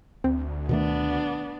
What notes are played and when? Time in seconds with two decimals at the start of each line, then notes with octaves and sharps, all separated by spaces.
0.24 D2 C4
0.69 B2 D#3 A3 B3 D4